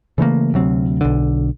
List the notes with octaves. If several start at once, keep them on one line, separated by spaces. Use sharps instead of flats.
C#3 E3 A3 A#3
D2 C3 F#3 C4
B1 D3